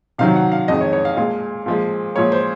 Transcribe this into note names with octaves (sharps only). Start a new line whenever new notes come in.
C3 D#3 F#3 F5
F#5
F5
F2 D#3 G#3 D#5
C#5
C#5
F5
A#2 G#3 F5
A#2 F3 G#3
A#2 F3 G#3 C#5
C5